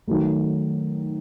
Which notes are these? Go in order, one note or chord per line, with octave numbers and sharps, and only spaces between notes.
D#3 F#3 A3